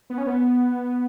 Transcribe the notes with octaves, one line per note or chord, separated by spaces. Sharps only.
B3
C#4
B3